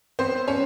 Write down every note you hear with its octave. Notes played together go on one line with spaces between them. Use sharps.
B3 C4 C5
C#4 C#5